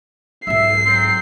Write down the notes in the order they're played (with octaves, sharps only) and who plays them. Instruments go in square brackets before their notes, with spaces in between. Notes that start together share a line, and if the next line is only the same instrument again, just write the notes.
[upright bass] B1 G#2 [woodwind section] E5 [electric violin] C7
[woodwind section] F#3 C4